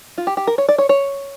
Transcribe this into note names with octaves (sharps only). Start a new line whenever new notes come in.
F4
G4
G4
A#4
C#5
D5
C#5
C#5